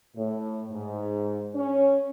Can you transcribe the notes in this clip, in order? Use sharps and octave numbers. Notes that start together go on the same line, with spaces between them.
A2
G#2
C#4